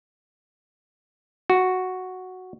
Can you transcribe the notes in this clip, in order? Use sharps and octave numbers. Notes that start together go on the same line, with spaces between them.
F#4